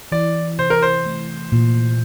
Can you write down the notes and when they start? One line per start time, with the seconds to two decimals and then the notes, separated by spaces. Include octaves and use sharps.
0.12 E3 D5
0.59 C3 C5
0.70 A#4
0.82 C5
1.06 A3
1.52 A#2